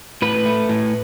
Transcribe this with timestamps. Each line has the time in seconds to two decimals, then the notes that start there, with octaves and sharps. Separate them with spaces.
0.22 A2 B4
0.45 A3
0.69 A2